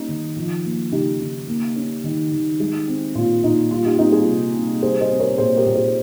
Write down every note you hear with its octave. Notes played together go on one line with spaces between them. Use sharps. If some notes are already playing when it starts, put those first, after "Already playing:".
Already playing: G3 A#3 C#4 D#4
D#3
F3
A#3
C#3 D#4 G4
C#3
A#3
C#4
D#3
D#3
G#3
C4
A#2 F4
A#2 D#4
G3 F4
D#4 G4
C4 D#4 G4
F4 G#4
C3
C3
G3 G#4 C5
C5 D#5
C4
A#4 C#5
A#2 G#4 C5
G4 A#4
A#2
G#4 C5